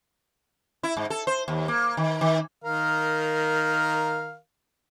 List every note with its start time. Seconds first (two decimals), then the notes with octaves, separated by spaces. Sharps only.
0.83 E4
0.97 G#2
1.10 A4
1.27 C5
1.48 D#2
1.68 A#3
1.97 D#3
2.21 D#3
2.64 D#3 A#4 F5